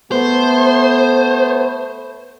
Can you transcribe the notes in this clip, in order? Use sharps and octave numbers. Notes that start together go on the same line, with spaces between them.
A3 B3 C5